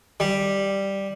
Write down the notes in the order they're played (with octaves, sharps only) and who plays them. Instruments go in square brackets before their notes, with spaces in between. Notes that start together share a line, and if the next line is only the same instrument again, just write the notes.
[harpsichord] G3